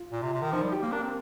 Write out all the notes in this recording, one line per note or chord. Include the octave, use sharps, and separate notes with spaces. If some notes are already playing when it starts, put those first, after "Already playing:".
Already playing: F4
A#2
C3
C3
D#3
F3 D#4
G3
G4
A#3
D4 A#4
C4